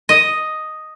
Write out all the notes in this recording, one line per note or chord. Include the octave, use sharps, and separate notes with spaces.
D#5